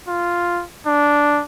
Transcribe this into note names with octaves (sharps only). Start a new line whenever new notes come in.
F4
D4